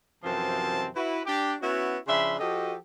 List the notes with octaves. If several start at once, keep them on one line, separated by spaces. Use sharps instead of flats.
F#2 C3 E3 F3 C4 A5
E4 F#4 B4
D4 G4
B3 C#4 E4 F#4
C#3 F3 D4 E5 B5 C6
F3 F#4 G4 A4 D#5